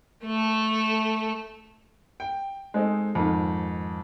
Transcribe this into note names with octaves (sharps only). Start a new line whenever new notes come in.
A3 A4
G5
G#3 C4 D#4 A4
F2 G#2 D#3